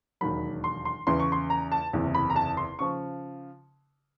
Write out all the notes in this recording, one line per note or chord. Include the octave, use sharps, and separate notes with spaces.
E1 D#2 D#3 F#3 B5
C6
C6
E2 C#3 E3 C6
C#6
C6
A#5
A5
F#1 E2 C3
B5
A#5
A5
C6
C#3 F3 C#6